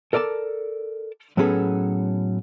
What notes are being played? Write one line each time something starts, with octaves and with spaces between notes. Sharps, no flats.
A4 A#4 D5 G5 A5
A2 F#3 B3 C#4 G#4 A4